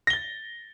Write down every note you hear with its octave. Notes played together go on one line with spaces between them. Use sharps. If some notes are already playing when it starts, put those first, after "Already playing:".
A6 A#6 G7